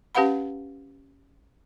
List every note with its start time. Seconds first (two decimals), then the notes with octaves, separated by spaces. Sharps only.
0.15 C#4 G4 B4 F5 F#5 B5